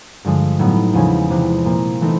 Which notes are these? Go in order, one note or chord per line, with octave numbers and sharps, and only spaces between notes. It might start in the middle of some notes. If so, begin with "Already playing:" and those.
G2 D3 F3 G#3
A2 F#3 B3 D#4
E2 C#3 F3 G#3 C#4
C3 E3 G#3
A#2 F3 A#3
E3 A3 C4 D#4